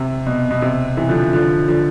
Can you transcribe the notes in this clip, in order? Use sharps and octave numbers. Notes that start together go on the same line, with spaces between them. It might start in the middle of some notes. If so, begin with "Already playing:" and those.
Already playing: C3
B2
B2
C3
C3 E3
D3 F3
D3 F3
D3 F3